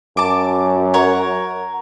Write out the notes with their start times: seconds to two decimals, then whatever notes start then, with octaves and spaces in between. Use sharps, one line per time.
0.17 F#2 A5 D6
0.94 A#4 C#5 F#5